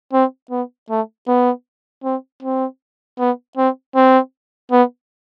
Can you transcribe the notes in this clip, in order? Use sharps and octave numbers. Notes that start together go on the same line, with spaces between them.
C4
B3
A3
B3
C4
C4
B3
C4
C4
B3